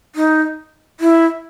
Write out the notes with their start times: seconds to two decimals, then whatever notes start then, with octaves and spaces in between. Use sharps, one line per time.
0.15 D#4
1.00 E4